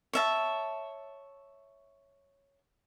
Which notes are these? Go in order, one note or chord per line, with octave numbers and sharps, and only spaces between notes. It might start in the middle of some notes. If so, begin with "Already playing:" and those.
C#5 E5 A5